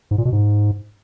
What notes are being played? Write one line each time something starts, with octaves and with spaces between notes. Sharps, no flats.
G#2
A#2
B2
G#2